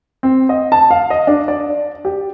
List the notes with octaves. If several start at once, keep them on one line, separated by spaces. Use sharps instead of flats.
C4
D#5
A5
F5
D#5
D4
D5
G4